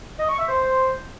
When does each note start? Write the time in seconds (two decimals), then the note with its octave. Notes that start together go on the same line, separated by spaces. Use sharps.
0.19 D#5
0.29 C#6
0.39 E5
0.49 C5